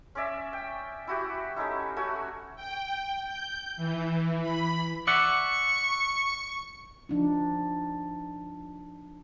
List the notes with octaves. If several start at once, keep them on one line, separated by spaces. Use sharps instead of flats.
C#4 C#5 D5 E5
G5
E4 F#4 G4
A3 C#4 D#4 E4
A3 C#4 F#4 C#5
G5
G6
E3
B5
D5 E5 F#5 C#6
F3 D4 D#4